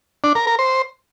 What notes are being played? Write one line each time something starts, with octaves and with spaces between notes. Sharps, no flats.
D4
A#4
A#4
C5